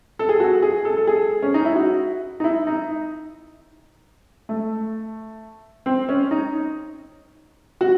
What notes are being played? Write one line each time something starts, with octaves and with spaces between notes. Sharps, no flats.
A4
G#4
F#4
G#4
A4
A4
G#4
C#4
D#4
E4
F#4
D#4
E4
D#4
A3
C4
C#4
D#4
F#4